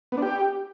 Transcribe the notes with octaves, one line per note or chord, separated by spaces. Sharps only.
B3
D4
G4